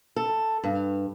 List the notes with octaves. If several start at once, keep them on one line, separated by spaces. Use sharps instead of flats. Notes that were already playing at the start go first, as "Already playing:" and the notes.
A4
G2